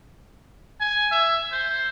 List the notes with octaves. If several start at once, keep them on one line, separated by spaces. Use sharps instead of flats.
G#5
E5
C5